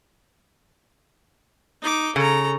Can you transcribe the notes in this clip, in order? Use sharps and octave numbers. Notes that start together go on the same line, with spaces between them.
D#4 D6
C#3 A4 A#5